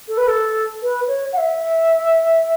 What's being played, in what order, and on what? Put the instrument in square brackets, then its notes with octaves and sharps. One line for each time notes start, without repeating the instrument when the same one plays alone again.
[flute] A4
B4
A4
B4
C#5
F#5
E5